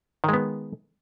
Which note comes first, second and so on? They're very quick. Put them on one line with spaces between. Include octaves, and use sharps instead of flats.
D#3 G#3 B3